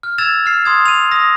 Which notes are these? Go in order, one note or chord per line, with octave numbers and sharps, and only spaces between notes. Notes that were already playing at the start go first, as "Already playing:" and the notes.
F6
E6 G#6 A6 E7 F7
F6 C7
C6 D#6 G#6
D#7 F7
D#6 A#6